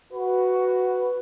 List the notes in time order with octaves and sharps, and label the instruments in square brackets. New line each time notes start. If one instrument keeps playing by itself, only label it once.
[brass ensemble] F#4 B4